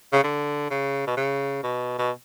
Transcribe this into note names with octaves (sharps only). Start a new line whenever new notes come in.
C#3
D3
C#3
B2
C#3
B2
B2